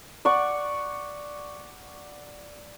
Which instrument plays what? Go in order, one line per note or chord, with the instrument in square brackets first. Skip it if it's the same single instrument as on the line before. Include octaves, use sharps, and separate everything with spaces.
[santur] D5 F#5 C#6